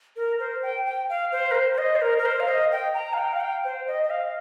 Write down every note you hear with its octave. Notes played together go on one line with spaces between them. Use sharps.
A#4
C5
G5
G5
F5
C5
A#4
C5
C5
D#5
C5
A#4
A#4
C5
F5
D#5
G5
A#5
F5
G5
F5
G5
C5
D#5
D#5
F5